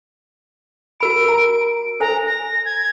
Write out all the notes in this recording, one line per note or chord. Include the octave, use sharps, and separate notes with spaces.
F#4 A#4 B5 D7
A#4 A#5
A4 C5 G#5 A#5
A#6
G#6